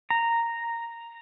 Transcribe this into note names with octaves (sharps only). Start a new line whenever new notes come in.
A#5